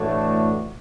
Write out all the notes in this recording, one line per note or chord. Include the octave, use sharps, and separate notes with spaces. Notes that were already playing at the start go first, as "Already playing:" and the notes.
Already playing: A2 E3 A3 D4 F#4